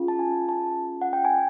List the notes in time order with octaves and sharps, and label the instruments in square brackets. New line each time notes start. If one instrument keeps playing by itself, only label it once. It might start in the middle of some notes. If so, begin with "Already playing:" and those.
Already playing: [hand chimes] C#4 F4 G#4
A5
G#5
A5
F#5
G5
G#5